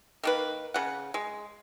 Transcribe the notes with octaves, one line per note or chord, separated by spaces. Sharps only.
D#3 A#3 B4
C#3 F#5
G#3